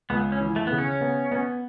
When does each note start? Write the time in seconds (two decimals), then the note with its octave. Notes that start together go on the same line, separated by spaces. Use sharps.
0.10 C#2 B3
0.32 C#4
0.40 E3
0.56 A3
0.67 C#3 B3
0.78 C#4
1.01 B3
1.32 B3